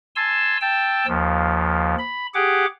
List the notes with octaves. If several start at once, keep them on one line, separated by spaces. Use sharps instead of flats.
G#5 A5 C6 E6
G5 A5 E6
D#2 F3
B5
G4 G#4 F#5 D6